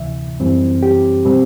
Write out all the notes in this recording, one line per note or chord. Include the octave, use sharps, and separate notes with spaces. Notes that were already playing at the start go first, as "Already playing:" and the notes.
Already playing: D2 C3 E3 E5
F#2 E3 G3 C4
G4
B2 G3 C4